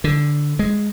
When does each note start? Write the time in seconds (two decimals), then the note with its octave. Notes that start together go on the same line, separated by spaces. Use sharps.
0.04 D3
0.59 G#3